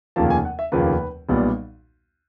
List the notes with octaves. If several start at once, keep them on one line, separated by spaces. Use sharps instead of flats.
F1 D#2 C#3 F3 A#3 A5
G#5
F#5
E5
F1 D#2 C#3 F3 A#3 B4
B1 A#2 G3 B3